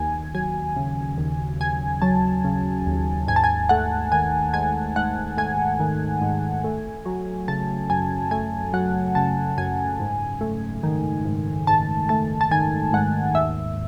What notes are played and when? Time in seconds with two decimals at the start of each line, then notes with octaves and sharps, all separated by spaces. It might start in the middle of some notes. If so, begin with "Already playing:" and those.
Already playing: D#2 G#5
0.35 F#3 G#5
0.76 C#3
1.18 D#2
1.60 D#2 G#5
2.02 F#3 A5
2.45 C#3
2.86 D#2
3.28 G#2 G#5
3.36 A5
3.44 G#5
3.69 A3 F#5
4.12 D#3 G#5
4.54 G#2 G#5
4.96 G#2 F#5
5.37 A3 G#5
5.80 D#3
6.22 G#2
6.64 A3
7.06 F#3
7.48 C#3 A5
7.90 F#2 G#5
8.31 A3 G#5
8.73 F#3 F#5
9.15 C#3 A5
9.58 F#2 G#5
10.00 G#2
10.41 A3
10.83 D#3
11.25 G#2
11.67 G#2 A5
12.09 A3 A5
12.41 A5
12.51 D#3 G#5
12.93 G#2 F#5
13.35 D#2 E5